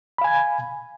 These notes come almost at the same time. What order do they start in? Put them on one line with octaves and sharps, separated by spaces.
B5 F5 G#5 G#6